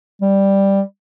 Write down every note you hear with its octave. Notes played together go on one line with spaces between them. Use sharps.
G3